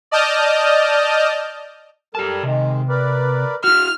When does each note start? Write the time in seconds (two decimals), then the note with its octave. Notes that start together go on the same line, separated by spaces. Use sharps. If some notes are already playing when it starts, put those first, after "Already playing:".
0.11 D5 D#5 A5 D#6 F6 G6
2.15 G3 G4 A4 A#4 A5
2.43 C3 D#3 G#3
2.89 A#4 B4 D5
3.64 E4 F#4 F6